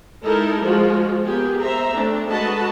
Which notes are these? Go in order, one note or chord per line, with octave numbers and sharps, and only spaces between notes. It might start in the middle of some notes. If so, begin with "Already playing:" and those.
G#3 D#4 E4 A4 A#4
F3 G#3 F4 F#4
A#3 B3 G4 G#4
C5 E5 A#5
A3 C4 D4
G#3 F#4 A4 B4 D#5 A5